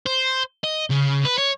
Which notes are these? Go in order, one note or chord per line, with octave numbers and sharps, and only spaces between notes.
C5
D#5
C#3
B4
C#5